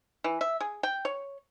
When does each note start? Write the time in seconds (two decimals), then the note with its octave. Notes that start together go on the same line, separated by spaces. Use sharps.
0.24 E3
0.41 E5
0.61 G#4
0.83 G5
1.05 C#5